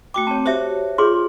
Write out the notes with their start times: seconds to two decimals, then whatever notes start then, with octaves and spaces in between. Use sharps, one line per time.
0.14 A3 F#4 G5 D6
0.27 C4 C#5 A5
0.46 F#4 G4 C5 C#5 E5
0.98 F4 G#4 C#5 C6